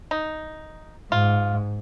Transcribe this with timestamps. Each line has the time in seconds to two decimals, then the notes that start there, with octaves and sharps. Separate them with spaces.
0.11 D#4
1.12 G#2 F4